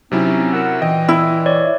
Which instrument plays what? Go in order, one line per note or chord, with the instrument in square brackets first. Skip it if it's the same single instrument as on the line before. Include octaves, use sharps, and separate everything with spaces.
[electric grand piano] C3 F#3 E4 [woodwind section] C4 C#4 D#4
[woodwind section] A#4 F#5 E6
[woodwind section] A#2 E3 [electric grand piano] D#5 [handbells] G5
[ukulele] E4
[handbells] C#5 D5